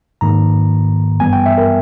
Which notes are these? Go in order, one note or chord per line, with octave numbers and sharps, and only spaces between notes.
G#2 D#3 A#3 A#5
G2 E3 G3 B3 G#5
G5
E5
A#4